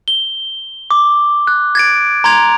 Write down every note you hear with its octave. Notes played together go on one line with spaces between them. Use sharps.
G7
D6
F#6
G#6 A6 D7
A#5 C6 G#6 F7